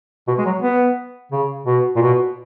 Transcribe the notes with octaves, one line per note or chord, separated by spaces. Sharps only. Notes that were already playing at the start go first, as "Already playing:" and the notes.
B2
G#3
F#3
B3
C#3
B2
A#2
B2